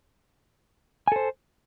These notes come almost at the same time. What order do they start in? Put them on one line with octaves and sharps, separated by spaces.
G#5 A4 C5